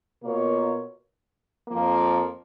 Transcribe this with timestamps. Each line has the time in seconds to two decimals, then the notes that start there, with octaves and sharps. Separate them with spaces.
0.22 B2 A#3 F4 A#4 C#5
1.68 F2 F3 A#3